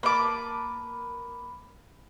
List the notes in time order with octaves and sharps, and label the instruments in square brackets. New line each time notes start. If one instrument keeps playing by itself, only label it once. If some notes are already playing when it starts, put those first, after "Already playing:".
[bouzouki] A#3 B4 A5 [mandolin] B5 D6